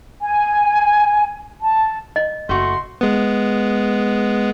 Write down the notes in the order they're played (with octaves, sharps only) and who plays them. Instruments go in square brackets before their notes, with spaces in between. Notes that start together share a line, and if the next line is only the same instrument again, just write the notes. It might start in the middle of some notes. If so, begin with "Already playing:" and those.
[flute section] G#5
A5
[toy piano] D#5
[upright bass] F#1 [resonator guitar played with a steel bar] A3 F#4 [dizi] C6
[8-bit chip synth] G#3 B3